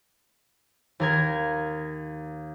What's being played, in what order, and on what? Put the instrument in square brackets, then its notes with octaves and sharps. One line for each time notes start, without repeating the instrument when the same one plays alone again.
[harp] D#2 A#4 G#6